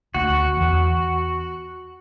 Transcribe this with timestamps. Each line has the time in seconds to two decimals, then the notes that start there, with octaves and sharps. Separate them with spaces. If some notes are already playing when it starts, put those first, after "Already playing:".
0.14 D2 F#4
0.57 E2